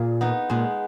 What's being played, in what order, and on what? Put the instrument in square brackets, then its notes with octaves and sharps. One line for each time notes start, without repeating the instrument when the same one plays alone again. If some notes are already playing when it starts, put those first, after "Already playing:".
Already playing: [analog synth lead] A#2 [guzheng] F4 G#4
[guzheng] B3 D#4
[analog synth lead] A#2 [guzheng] G#3 B3